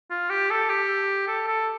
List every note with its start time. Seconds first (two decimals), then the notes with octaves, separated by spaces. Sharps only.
0.11 F4
0.30 G4
0.51 A4
0.69 G4
1.28 A4
1.47 A4